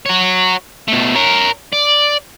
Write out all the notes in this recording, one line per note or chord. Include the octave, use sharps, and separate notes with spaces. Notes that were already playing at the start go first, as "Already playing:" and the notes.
F#4 C#5
B2 A3
A#4 C#5
D5